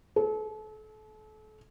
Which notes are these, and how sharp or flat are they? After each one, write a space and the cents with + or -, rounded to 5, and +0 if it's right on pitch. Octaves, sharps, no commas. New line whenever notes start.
A4 -35